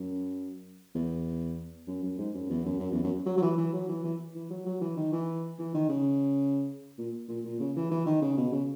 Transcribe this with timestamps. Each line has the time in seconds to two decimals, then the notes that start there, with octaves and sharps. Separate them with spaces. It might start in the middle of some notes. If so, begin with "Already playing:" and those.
Already playing: F#2
0.95 E2
1.87 F#2
2.03 F#2
2.18 G#2
2.34 F#2
2.50 E2
2.65 F#2
2.80 F#2
2.92 E2
3.04 F#2
3.26 F#3
3.38 F#3
3.42 E3
3.58 E3
3.73 F#3
3.88 E3
4.04 E3
4.35 E3
4.50 F#3
4.66 F#3
4.81 E3
4.97 D#3
5.12 E3
5.59 E3
5.74 D#3
5.89 C#3
6.98 A#2
7.28 A#2
7.45 A#2
7.60 C#3
7.76 E3
7.91 E3
8.06 D#3
8.22 C#3
8.37 B2
8.52 C#3